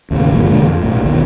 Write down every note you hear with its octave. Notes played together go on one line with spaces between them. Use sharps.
D#2 A2 C#3
G1 A#2 F3
E1 C#2 D3 G#3
F2
B1 A2
A#1 D#2 B2 D#3